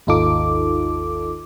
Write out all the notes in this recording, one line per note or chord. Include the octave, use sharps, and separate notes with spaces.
G#1 D#2 D#4 F4 A4 D6